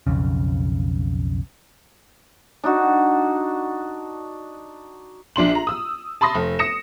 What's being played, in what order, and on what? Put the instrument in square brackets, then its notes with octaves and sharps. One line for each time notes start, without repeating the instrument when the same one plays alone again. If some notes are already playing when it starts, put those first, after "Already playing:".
[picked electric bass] B1 F2 C#3
[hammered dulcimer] D4 D#4 F#4
[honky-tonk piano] A#1 D4 C6 F#7
A#5
D#6 E6
A5 B5 C6 D#6 A#6
F1
D#6 A#6 C#7 E7